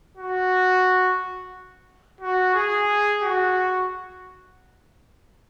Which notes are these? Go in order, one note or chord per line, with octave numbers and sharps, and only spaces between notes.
F#4
F#4
G#4
F#4